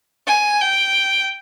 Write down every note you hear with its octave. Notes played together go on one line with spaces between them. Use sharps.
G#5
G5